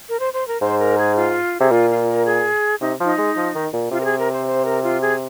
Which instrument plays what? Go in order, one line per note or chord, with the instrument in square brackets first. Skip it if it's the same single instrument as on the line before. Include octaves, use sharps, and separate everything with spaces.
[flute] A#4
C5
C5
A#4
[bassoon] G#2 [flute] C5
[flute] A#4
G#4
F4
[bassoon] C3 [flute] G#4
[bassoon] A#2 [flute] F4
[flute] F4
A#4
G#4
[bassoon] C3 [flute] D#4
[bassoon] F3 [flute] D#4
[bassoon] G#3
F3
D#3
A#2
[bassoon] C3 [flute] F4
[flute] A#4
G#4
A#4
C5
C5
A#4
F4
G#4